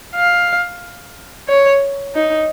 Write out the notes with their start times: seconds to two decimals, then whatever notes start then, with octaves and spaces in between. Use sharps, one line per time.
0.16 F5
1.48 C#5
2.15 D#4